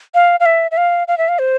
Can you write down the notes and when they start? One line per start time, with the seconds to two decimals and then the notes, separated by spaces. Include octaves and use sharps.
0.15 F5
0.40 F5
0.46 E5
0.71 E5
0.77 F5
1.08 F5
1.18 E5
1.29 F5
1.39 C5